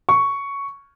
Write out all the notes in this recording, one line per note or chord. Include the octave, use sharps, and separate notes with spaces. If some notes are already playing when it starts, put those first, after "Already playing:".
C#6